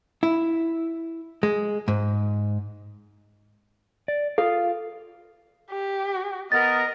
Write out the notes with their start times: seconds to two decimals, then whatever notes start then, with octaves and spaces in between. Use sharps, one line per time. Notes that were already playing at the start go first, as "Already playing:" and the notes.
0.23 E4
1.43 G#3
1.88 G#2
4.08 D5
4.38 F4 A4 F5
5.71 G4
6.52 B3 A#4 D#5 A6